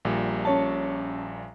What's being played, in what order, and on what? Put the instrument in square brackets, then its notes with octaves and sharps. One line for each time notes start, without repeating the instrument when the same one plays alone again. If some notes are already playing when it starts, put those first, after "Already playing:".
[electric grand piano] A#1 A#2 G3
[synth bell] C#4 C#5 A5